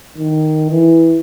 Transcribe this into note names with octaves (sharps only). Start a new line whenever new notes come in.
D#3
E3